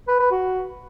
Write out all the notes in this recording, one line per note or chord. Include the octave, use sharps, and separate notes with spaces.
B4
B4
F#4